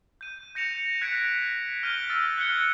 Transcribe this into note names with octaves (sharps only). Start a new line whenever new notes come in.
G6 D#7
G6 A#6 C#7 E7 F7
F#6 G#6 B6 C#7 D7 F7
F6 G6 D#7 G7
E6 A6
F#6 G#6 C#7 G7